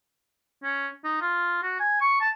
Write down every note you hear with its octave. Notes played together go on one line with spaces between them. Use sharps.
C#4
D#4
F4
F#4
G#5
C#6
A5